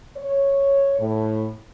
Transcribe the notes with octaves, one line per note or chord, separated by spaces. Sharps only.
C#5
A2